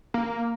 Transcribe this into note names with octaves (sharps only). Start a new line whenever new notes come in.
A#3